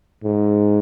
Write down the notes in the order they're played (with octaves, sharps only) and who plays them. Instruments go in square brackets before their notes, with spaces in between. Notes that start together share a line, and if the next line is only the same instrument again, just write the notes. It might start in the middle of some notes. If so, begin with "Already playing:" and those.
[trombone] G#2